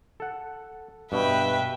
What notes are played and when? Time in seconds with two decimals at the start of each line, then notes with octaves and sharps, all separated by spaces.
0.20 A4 F#5
1.12 G2 B2 B4 E5 G5